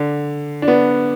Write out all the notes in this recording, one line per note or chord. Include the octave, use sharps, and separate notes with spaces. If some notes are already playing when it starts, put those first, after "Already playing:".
Already playing: D3
D4
B3